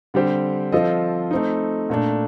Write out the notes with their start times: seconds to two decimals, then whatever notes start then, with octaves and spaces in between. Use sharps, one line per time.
0.14 D3 G3 C4 G4 C5
0.72 F3 C4 F4 A4 D#5
1.31 A3 C4 D#4
1.90 A#2 A3 D4